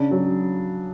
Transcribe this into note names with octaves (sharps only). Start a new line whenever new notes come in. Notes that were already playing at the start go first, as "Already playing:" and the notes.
Already playing: C#3 D4
F#3